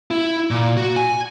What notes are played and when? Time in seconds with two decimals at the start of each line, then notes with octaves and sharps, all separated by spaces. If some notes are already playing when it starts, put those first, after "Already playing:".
0.11 E4
0.51 A#2
0.77 F#4
0.97 G#5